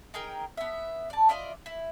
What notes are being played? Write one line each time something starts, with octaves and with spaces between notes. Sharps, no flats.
D#4 G#4 A#4 G5
B3 E5
D5 A5
E4 F4 D5 D#5
E4